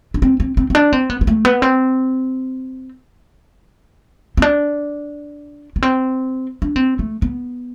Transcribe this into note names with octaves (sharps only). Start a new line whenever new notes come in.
D4
C4
C4
C4
C4
D4
C4
B3
B3
A3
B3
C4
C4
D4
B3
C4
D4
C4
A3
B3